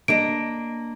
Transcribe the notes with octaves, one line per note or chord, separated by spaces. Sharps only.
A#3 D4 D#5 D7